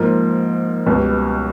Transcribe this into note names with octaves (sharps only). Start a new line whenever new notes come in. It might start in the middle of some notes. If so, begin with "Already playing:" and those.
Already playing: G#2 F3 A#3
C#2 B2 G3